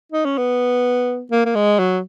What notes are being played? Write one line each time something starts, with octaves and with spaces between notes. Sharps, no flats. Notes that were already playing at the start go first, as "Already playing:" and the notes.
D#4
C#4
B3
A#3
A#3
G#3
F#3